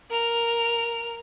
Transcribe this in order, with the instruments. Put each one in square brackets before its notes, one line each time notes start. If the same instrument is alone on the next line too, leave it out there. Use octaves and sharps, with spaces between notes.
[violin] A#4 F7